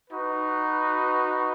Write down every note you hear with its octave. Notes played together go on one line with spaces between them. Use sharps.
D#4 F#4 B4